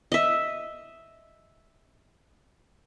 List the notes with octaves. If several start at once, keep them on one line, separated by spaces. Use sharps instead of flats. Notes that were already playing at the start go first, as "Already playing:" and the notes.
D#5 E5